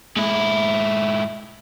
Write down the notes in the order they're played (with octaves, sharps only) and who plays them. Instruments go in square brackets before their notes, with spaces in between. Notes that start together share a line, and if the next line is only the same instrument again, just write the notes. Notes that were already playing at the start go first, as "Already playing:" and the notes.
[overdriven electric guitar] G#2 E4